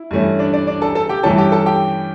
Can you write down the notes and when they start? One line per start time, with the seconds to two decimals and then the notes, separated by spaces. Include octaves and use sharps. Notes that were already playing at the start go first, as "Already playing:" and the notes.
Already playing: E4
0.11 G2 E3 A3 C#4
0.39 D4 D5
0.53 D4 D5
0.67 D4 D5
0.82 A4 A5
0.95 A4 A5
1.09 G4 G5
1.23 G2 E3 A3 C#4 A4 A5
1.38 G4 G5
1.52 A4 A5
1.66 G4 G5